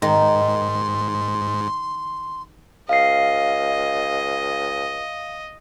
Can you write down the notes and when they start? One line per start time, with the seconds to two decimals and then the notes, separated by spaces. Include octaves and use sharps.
0.02 G#2 D#3 C6
2.89 C#2 D#5 F5 C7